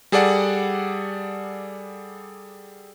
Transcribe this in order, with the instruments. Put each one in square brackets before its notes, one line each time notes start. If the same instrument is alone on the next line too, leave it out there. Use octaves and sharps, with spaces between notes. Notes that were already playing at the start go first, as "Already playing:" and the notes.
[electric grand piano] G3 G#4 A4 D5 F#5